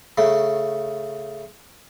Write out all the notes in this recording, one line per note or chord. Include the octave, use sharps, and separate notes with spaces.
C#3 A3